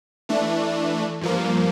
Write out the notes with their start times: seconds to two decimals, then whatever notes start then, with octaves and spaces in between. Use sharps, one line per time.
0.29 E3 A3 D4
1.21 G2 F3 A#3